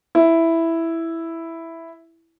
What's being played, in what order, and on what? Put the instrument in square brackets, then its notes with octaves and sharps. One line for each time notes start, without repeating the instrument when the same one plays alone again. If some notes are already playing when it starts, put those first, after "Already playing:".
[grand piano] E4